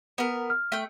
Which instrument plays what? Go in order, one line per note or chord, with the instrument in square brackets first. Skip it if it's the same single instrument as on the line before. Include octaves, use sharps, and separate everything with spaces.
[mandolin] B3 A#4
[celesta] F6
[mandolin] A3 G5